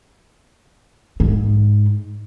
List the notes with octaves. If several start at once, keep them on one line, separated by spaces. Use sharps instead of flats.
G#2